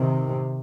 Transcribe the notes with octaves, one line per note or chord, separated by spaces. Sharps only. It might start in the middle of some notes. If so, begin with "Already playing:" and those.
Already playing: C3 D#3